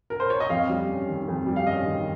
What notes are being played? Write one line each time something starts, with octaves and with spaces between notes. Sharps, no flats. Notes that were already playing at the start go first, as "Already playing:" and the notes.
A#4
C5
C#5
D#5
F2 F5
G3
C#4
D#3
F2
G3
F5
C#4 D#5
D#3